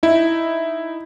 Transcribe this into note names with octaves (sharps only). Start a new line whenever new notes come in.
D#4 E4